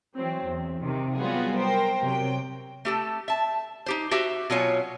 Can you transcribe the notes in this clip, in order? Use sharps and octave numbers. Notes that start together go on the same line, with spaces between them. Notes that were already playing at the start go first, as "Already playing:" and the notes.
E3 F#3 C4
E2
C3 D#3
F#3 G3 B3 F4 F#4 G#4
A#4 C5 G5
C3 F#3 G5
A3 G4 A4
E5 A5
D#4 G4 C5
F#4 G4 C5 E5
B2 F#3 F4 C#5 G#5